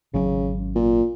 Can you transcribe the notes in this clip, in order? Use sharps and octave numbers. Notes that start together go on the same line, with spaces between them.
G#1 C#3 F#3 C#4
A#2